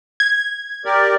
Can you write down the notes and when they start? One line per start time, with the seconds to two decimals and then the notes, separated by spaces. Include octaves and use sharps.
0.20 G#6
0.85 G4 A#4 D5